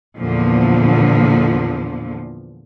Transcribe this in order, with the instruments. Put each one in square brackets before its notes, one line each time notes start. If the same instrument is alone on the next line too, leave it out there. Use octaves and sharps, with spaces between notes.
[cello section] E2 A#2 D3 F3